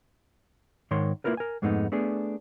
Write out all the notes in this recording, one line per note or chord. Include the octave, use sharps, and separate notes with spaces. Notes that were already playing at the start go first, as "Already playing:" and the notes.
G#2 D#3 A#4 C#5 C6
A#3 C#4 E4 F4 A#4 B4
A#4 G#5
F2 G#2 G#3 A3 B3 D#4
A3 B3 D4 G#4